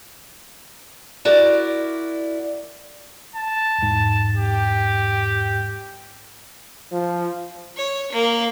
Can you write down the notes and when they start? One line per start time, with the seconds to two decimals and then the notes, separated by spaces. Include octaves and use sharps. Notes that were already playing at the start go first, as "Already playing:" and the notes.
1.25 E4 F#4 A#4 D5
3.36 A5
3.78 E2 G#2
4.36 G4
6.92 F3
7.77 C#5
8.12 A#3